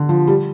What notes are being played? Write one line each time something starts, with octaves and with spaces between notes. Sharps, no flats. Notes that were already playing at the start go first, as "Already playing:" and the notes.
Already playing: D3
F3
G3